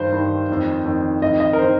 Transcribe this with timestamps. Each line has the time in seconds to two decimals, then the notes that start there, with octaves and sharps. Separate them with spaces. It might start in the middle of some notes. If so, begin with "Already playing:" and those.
Already playing: G2 D#3 C5
0.12 G2 D#3
0.49 F2 D#3
0.85 F2 D#3
1.22 F2 D#3 D#5
1.40 D#5
1.53 A#4
1.59 D#3 C5